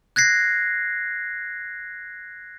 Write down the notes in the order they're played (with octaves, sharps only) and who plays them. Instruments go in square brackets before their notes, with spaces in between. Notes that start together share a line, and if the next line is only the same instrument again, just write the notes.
[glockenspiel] F#6 G#6 A#6 C7